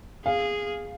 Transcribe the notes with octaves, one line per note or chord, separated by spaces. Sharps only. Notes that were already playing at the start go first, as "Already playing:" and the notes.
G#4 F5